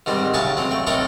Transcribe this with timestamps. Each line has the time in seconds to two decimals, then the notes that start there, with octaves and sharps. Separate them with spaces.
0.06 G#2 D#3 G3 C4
0.34 A2 C#3 F#3 G#5 A5 C#6
0.57 F#3 C4
0.71 A3 G5
0.87 A2 C4 D#4 A4 A#4 C#6